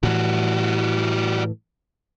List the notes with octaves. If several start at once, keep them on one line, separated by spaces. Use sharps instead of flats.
A2 E3 G3 F#4